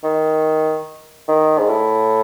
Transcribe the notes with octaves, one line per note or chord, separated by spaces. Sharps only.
D#3
D#3
G#2
A2